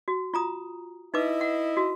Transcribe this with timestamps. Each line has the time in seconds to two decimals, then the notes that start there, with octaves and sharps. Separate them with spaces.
0.08 F#4
0.34 F4 A#5 D#6
1.14 D#4 E4 B4 D#5 E5 D6
1.41 F#5
1.77 F#4